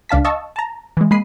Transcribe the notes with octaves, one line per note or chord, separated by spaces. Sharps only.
C#2 D4 F5 A5 B6
D#5 F5 A5 C#6 E6
A5 A#5
E3 G#3
G#3 A#3 B5 C7 D#7